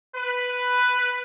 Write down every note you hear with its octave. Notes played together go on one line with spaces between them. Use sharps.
B4